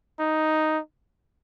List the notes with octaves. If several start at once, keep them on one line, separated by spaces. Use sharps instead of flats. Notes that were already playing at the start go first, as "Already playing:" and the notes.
D#4